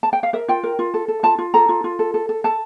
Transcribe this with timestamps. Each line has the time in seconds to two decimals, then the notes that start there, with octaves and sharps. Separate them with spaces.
0.03 A5
0.13 G5
0.23 F5
0.33 A#4 E5
0.48 F4 G5
0.64 A#4
0.79 F4
0.94 A4
1.08 A4
1.23 F4 A5
1.39 F4
1.54 A4 A#5
1.69 F4
1.84 F4
1.99 A4
2.14 A4
2.29 A4
2.44 A4 A5